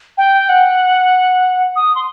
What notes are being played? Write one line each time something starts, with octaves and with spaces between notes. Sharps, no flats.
G5
F#5
D#6
C6